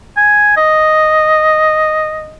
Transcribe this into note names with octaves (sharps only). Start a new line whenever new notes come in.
G#5
D#5